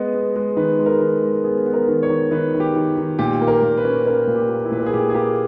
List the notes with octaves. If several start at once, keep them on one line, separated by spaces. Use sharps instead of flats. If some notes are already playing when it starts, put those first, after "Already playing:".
Already playing: G#3 B3 D#5
B3
G#3
D#3 B4
G#3
A#4
D#3
G#3
B3 G#4
B3
A#4
D#3
C#5
D#3
D#3 B4
D#3
G4
D#3
D#3
A#2 G4
A#3
A#4
A#2
B4
C#4
C#4 A#4
A#2
G4
A#3
E4
A#2 B4
A#4
G#4
A#2 G4
G#4
A#3 G4